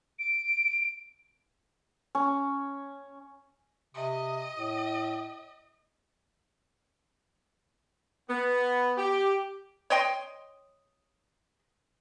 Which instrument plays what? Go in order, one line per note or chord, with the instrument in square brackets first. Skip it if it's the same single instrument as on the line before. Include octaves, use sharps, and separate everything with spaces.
[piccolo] D7
[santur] C#4
[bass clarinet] C3 [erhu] D#5
[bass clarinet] A2
[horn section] B3
G4
[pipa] C#5 D#5 G5 C6